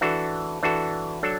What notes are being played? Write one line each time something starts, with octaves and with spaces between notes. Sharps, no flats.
E3 D4 F#4 A4
E3 D4 F#4 A4
F#3 D4 A4